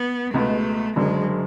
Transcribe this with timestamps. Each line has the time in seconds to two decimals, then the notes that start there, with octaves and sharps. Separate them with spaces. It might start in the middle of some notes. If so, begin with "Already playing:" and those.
Already playing: B3
0.34 C#2 B2 G#3 A3 B3
0.96 F#1 F#2 D3 G#3